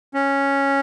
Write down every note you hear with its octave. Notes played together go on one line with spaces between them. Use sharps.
C#4